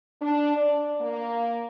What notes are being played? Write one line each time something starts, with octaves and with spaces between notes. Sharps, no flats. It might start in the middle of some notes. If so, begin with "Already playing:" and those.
D4
D5
A#3